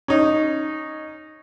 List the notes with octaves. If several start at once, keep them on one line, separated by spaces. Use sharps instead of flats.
C#4 D#4